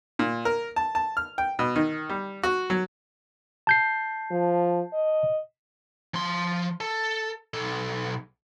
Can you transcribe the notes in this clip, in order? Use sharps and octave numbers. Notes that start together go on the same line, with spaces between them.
A#2
A#4
A5
A5
F6
G5
B2
D#3
G3
F#4
F#3
A5 G6 C7
F3
D#5
F3 C6
A4
B1 A4